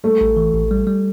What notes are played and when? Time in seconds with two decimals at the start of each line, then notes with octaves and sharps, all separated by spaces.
0.04 G3 A3
0.21 A1
0.37 E3
0.54 A1
0.71 G3
0.87 G3